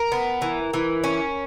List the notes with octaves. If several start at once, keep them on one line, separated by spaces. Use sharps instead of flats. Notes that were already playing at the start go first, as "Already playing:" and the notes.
Already playing: A#4
B3
E3
E3
C#4